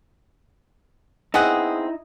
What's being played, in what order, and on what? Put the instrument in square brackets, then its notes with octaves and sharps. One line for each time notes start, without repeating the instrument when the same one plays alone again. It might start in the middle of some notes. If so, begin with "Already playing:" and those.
[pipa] B3 C4 F#5 [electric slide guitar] D#4 E4 [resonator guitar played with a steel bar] G#4 D#5